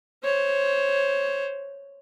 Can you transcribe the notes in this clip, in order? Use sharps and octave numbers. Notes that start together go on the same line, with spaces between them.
C5 C#5